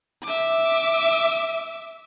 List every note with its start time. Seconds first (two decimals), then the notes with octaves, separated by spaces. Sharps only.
0.23 E5 D6